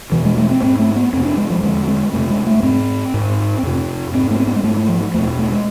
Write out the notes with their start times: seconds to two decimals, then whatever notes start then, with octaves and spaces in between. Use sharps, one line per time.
0.12 E2 B2 E3
0.25 G#3
0.38 A3
0.50 C4
0.63 G#2 C4
0.79 A3
0.96 B3
1.13 F2 C4
1.17 C3
1.25 D4
1.37 G#3
1.50 F3
1.63 E2 D3 G#3
1.88 G#3
2.13 F2 C3 A3
2.30 G#3
2.47 A3
2.63 G#2 C4
3.14 G#2
3.63 F2 C3
4.14 G#2 C4
4.31 A3
4.39 C4
4.47 B3
4.56 G#3
4.64 G#2 A3
4.77 A3
4.89 F3
5.14 E2 A3
5.18 B2
5.39 A3
5.52 G#3